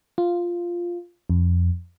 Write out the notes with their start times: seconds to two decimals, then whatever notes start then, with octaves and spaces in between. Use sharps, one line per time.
0.18 F4
1.30 F2